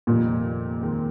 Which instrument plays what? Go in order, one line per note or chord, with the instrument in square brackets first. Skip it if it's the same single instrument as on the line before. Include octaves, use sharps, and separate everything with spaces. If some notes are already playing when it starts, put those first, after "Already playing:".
[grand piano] F1 F2 D#3 G3 A#3 [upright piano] A#2
[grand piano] D#2 D#3 G#3 C4